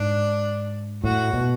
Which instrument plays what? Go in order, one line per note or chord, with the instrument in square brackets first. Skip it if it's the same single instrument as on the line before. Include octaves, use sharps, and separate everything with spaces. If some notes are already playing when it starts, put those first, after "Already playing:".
Already playing: [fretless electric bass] G#2 [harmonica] D4
[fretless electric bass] A2 [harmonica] F#4
[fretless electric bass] B2